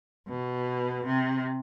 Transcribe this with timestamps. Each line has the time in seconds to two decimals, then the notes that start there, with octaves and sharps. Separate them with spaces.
0.28 B2
1.06 C3